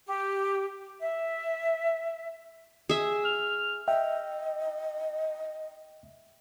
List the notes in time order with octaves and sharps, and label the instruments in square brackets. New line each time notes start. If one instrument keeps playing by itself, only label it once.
[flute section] G4
E5
[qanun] G#4 E5
[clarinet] F6
[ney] D#5 [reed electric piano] E5 G5